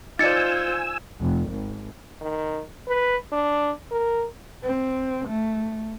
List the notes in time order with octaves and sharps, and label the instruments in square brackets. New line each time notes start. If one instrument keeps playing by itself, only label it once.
[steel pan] D#4 D5 [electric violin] F4 C5 [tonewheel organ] G#5 E6 [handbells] A6 C#7
[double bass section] F1
G#1
[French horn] D#3
B4
D4
A#4
[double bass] C4
A3